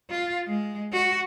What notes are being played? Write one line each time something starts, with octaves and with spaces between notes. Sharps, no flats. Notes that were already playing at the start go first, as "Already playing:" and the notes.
F4
G#3
F#4